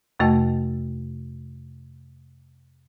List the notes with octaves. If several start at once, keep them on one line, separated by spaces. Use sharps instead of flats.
F2 C3 A3 F#4 D#5 A5